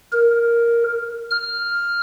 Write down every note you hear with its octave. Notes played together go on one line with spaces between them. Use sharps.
A#4
F6